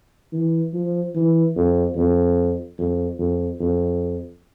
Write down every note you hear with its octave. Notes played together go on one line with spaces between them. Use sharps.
E3
F3
E3
F2
F2
F2
F2
F2